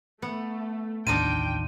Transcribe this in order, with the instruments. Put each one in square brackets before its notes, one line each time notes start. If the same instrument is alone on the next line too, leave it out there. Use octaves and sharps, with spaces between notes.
[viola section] A3 [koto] B3 F#5
[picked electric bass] A1 D#2 [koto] D4 D#4 F4 [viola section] G5 [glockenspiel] D#7